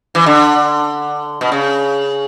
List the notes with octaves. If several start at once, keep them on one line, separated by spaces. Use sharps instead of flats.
E3
D3
B2
C#3